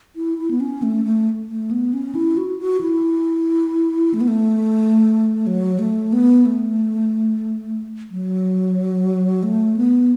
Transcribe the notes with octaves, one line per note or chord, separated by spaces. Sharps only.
E4
E4
B3
C#4
A3
A3
A3
B3
C#4
E4
F#4
F#4
E4
A3
B3
A3
F#3
A3
B3
A3
F#3
A3
B3